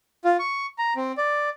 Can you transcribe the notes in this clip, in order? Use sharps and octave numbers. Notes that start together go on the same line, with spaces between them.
F4
C#6
A#5
C4
D5